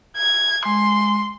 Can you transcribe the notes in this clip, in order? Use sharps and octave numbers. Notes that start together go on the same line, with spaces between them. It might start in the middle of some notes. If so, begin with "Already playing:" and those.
G#6
G#3 C6